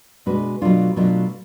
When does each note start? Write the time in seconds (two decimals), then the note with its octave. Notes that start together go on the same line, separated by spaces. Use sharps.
0.26 B2 G#3 D4 F#4 B4
0.61 B2 F#3 A3 D4 F4
0.96 B2 F#3 A3 D4 F4